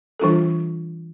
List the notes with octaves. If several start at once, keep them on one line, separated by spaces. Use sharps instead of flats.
E3 G3 D4 F4 A4